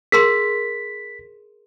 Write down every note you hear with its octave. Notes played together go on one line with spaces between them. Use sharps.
G#4 A#4 C6 B6